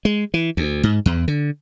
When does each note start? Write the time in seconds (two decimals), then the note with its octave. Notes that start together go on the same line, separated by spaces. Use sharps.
0.05 G#3
0.34 E3
0.57 D2
0.83 G#2
1.06 E2
1.28 D3